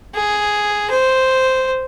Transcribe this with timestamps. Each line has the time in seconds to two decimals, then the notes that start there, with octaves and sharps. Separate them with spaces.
0.15 G#4
0.91 C5